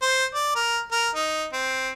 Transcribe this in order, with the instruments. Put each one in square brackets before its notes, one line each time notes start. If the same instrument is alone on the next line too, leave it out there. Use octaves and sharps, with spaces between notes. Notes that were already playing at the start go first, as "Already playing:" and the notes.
[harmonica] C5
D5
A#4
A#4
D#4
C4